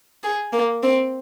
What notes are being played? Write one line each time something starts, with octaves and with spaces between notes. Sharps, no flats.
G#4
A#3
C4